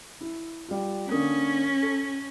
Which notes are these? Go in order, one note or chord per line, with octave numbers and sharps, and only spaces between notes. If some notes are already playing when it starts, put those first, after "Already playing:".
E4
G3 F4
D3 A#3 C#4 D#6
A4